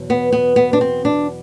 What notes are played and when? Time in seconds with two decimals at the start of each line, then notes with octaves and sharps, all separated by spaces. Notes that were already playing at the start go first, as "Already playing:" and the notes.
Already playing: E2 B2 F#3
0.10 B3
0.32 B3
0.56 B3
0.73 D4
0.81 C4
1.05 D4